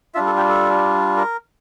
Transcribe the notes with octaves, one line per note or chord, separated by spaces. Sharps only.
G3 D4 F4 E5
A4
G4
A4
A#4